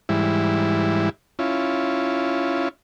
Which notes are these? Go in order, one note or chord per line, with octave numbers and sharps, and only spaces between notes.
G#2 E3 G3 E4
C#4 E4 F4